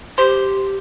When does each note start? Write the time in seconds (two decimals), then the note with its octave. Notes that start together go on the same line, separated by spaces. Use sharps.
0.18 G4 C5